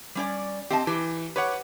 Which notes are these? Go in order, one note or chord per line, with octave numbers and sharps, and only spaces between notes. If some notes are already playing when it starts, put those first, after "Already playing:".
G3 C#4 D5
C4 G4 D#5 A5
E3 G4
G4 B4 C#5 F#5